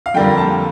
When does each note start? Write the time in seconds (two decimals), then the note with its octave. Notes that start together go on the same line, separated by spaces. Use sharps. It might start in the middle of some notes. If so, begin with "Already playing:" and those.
0.06 F5
0.14 F2 D3 G3 A#3 G5
0.37 A5